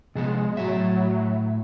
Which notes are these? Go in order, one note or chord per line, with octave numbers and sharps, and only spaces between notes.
C3 F3 G#3 B3
A2 F#3 E5